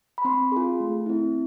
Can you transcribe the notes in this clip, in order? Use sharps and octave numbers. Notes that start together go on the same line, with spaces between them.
B5
C4 C6
F4 G#4
A3
C4 E4